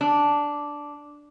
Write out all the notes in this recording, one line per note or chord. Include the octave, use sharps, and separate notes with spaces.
D4